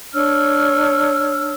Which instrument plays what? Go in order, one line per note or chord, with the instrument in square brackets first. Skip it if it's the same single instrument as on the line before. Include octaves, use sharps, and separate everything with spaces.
[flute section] D4 C#5 E6 F6